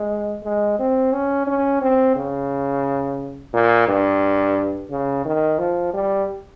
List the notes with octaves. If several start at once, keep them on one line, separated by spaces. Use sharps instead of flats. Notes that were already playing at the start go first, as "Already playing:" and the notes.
Already playing: G#3
G#3
C4
C#4
C#4
C4
C#3
A#2
G2
C#3
D#3
F3
G3